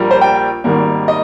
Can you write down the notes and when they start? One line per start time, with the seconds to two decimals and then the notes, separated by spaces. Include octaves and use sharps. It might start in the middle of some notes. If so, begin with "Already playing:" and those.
Already playing: A#1 A#2 G3 A#3
0.11 C5
0.21 G5
0.64 G#1 G#2 D#3 G3 A#3
1.08 D#5